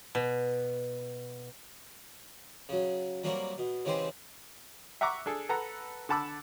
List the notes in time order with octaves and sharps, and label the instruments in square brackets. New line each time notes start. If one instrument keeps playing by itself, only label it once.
[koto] B2
[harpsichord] C#3 F#3
F#3 G3 A#3 C4 F#4 A#4
B2
C#3 E3 G#3 C4 G4 C5
[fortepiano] E5 F#5 A#5 C#6 D6
D4 G#4 A4
A4 B4 F#5 A#5
D3 F#5 A5 B5 D6 E6